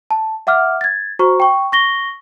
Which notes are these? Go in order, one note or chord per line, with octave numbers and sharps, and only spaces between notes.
A5
E5 F#5 D6 F6
G#6 A6
F#4 C5 A#5 C#6
G5 C#6
C#6 A#6 G7